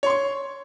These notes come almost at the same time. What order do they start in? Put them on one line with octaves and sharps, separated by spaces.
C#5 C6 C#6